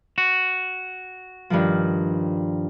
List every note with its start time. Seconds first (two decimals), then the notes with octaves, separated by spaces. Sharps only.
0.18 F#4
1.50 G2 D#3 F3